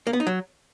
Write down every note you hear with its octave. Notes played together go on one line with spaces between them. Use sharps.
A#3
B3
D#4
F#3